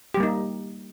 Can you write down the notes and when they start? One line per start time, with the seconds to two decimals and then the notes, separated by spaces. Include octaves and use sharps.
0.14 G4
0.17 G3
0.20 A#3
0.23 D#4